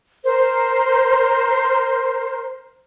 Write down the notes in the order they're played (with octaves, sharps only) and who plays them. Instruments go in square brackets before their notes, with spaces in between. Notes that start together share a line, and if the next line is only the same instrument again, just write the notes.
[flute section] A#4 C5